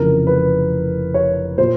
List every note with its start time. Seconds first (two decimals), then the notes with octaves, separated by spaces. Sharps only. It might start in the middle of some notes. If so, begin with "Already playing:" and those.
Already playing: F1 F2 C#3 E3 A#4
0.27 B4
1.14 C#5
1.58 A#2 C5